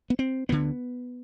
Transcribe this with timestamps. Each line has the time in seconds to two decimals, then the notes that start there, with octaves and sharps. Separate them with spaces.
0.10 B3
0.19 C4
0.49 D2 D3 B3